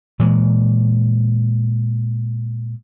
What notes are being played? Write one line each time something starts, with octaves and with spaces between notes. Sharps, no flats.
A#2 E3 G#3